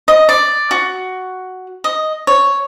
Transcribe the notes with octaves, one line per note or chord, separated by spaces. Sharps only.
D#5
D5
F#4
D#5
C#5